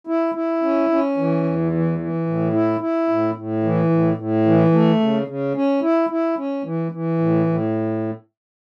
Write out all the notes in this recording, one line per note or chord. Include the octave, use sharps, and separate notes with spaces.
E4
E4
C#4
C#4
E3
E2
E3
E3
A2
E4
E4
A2
A2
E3
A2
A2
E3
A3
C#3
C#3
C#4
E4
E4
C#4
E3
E3
A2
A2